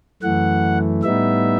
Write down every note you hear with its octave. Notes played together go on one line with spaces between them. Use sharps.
F#2 E3 A3 F#5
A2 G3 B3 D#4 E5